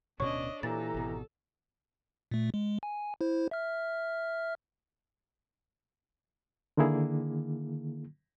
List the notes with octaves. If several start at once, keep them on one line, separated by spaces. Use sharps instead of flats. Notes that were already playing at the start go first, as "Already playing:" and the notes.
D1 B2 C#4 D4 C#5 D#5 C#6
A#2 E3 G4 A4 A#5 A6
G#1 B2
A#2 A3
G#3
G#5
E4 C5
E5 F6
D3 D#3 A#3 E4 G#4